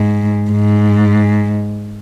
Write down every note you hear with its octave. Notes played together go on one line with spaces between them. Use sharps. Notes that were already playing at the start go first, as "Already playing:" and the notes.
Already playing: G#2
G#2